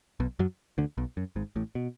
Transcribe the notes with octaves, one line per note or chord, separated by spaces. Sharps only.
B1 B2
F#2 F#3
D2 D3
B1 B2
F#2
G#1 G#2
A1 A2
B2